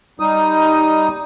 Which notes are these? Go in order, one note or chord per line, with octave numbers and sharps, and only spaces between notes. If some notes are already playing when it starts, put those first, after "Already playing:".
G3 D#4 D#6